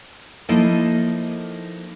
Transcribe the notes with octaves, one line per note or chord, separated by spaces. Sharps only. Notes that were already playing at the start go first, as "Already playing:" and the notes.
F3 A#3 D#4 E4 A4 D#5